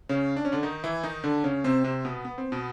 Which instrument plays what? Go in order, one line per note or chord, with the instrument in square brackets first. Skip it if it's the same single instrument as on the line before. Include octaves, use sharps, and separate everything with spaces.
[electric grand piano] C#3 C#4
D4
C#4
D3 D4
D#3 D#4
E3 E4
D#3 D#4
D3 D4
C#3 C#4
C3 C4
C3 C4
B2 B3
B3
C4
B2 B3